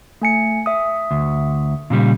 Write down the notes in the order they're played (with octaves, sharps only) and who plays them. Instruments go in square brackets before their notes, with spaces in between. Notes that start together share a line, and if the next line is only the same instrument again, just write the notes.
[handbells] A3 G#5 C#7
E5 D#6
[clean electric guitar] D2
A#2 C#3 G3